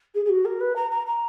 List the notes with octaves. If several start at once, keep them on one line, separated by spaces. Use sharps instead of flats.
G#4
G#4
F#4
A#4
B4
A#5
A#5
A#5